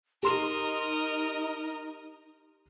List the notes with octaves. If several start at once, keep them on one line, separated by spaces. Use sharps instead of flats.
D#4 G4 A#4 D#5 C6 E7